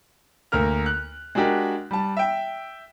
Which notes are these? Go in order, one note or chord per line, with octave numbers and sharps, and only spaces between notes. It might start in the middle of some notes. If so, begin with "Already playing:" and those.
D2 A#3 A#4 F6
F#6
G#3 D4 F#4 G4 A#4
G3 A5
E5 G5